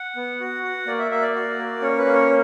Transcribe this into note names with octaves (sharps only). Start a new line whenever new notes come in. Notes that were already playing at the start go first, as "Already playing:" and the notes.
Already playing: F#5
B3
F#4
F#4
A#3 D5
E5
A#3 E5
D5
F#4
A#3
C#4 C#5
B4
A#3
C#5